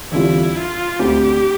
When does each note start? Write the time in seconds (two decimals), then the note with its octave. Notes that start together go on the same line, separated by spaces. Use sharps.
0.11 E2 D3 G3 C4 E4 F4
0.56 F4
0.99 D2 D3 A3 C4 G4